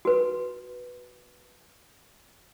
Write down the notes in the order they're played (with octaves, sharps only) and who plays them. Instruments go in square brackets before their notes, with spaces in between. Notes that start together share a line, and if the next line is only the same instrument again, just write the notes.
[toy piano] F#4 B4